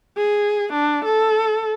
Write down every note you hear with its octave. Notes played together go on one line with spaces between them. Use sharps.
G#4
D4
A4